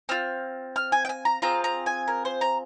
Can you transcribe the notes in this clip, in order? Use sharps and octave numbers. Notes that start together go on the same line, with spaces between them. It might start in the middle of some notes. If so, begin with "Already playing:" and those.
C4 F4 F6
F6
G#5
G5
G#5
A#5
C4 F4 G#4 A#5
A#5
G#5
A#4
C5
A#5